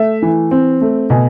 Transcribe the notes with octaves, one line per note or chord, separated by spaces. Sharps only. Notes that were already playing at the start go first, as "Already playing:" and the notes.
Already playing: A3 E5
E3
C4
A3
B2 G#5